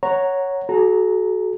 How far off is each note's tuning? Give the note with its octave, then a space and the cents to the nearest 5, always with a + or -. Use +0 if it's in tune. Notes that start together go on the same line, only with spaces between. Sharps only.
C#5 +0 F#5 +0 A#5 +0
F#4 +0 A4 -40 A#5 +0